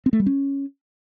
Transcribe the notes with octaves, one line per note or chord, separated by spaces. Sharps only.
C4
A3
G3
C#4